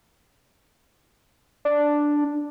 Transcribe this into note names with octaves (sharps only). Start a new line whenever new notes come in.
D4